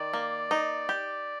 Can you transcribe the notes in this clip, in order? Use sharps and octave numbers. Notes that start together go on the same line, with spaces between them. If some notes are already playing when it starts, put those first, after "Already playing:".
Already playing: D#3 D5
A#3
D#4
G4